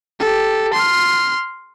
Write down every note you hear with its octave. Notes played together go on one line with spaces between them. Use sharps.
G4 A4
C6 F6